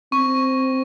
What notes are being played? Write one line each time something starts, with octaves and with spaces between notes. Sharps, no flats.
C4 C#6